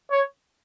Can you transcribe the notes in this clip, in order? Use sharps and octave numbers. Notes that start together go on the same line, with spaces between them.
C#5